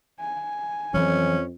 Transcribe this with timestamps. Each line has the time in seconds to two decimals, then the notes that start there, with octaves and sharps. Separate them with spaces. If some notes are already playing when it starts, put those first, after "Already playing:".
0.20 G#5
0.94 F2 E3 F#3 C#4